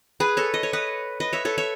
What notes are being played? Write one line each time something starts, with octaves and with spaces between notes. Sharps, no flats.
G#4 B4
A4 C#5
D#5
C#5
B4 D#5
B4 D#5
C#5 E5
A4 C#5
C#5 E5